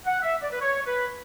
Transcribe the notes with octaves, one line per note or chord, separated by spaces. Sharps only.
F#5
E5
D5
B4
C#5
B4